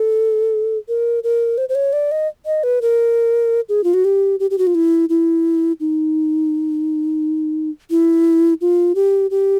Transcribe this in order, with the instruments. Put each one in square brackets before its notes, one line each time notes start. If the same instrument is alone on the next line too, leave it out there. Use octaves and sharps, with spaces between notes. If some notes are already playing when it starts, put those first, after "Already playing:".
Already playing: [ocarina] A4
A#4
A#4
C5
C5
C#5
D5
D#5
D#5
B4
A#4
G#4
F4
F#4
G4
G4
G4
F#4
F4
E4
E4
D#4
E4
F4
G4
G4